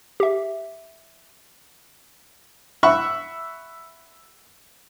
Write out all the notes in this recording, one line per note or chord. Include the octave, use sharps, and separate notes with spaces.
G4 E5
E5 F#5 B5 C#6 E6